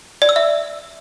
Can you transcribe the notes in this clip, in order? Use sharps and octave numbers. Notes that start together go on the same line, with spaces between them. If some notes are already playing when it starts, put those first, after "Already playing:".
D5
E6
E5